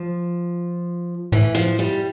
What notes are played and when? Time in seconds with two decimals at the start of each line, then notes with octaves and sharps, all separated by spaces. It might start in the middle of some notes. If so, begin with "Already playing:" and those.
Already playing: F3
1.32 A2 E3
1.55 F3
1.79 G3